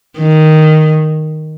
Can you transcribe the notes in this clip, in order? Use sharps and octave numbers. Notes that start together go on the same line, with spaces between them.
D#3